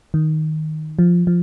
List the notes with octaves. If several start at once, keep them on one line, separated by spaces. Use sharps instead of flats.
D#3
F3
F3